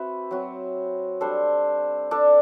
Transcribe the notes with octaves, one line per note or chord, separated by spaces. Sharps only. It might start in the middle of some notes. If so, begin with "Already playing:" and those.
Already playing: C4 F#4 B4 E5
F#3 C4 F#4
G3 D4 A4 C5
D4 A4 D5